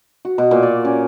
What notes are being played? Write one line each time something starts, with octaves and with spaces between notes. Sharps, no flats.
F#4
B2
A#2
D5
C#4